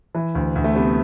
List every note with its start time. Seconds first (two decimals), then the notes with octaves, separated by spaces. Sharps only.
0.15 E3
0.35 D2
0.55 D2
0.64 A3
0.76 C3 B3